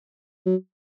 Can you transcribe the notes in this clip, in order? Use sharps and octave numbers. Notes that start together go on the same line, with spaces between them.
F#3